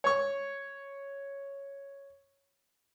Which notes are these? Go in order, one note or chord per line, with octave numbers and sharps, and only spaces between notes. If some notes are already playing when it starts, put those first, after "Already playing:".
C#5 C#6